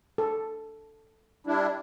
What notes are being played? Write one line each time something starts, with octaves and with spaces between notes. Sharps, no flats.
A4
G3 D4 E4